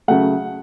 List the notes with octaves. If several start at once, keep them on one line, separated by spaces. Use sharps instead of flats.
C#3 F#3 A3 F#5